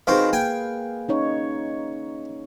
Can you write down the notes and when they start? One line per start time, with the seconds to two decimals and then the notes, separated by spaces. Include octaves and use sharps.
0.07 D#3 C4 F#4 G#4 B4 F5
0.33 A#3 G5 G#5
1.09 C#4 D#4 C#5